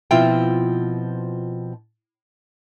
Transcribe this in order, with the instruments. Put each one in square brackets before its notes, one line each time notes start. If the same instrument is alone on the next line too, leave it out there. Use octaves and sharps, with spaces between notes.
[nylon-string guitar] B2 F3 C4 E4 F4 G5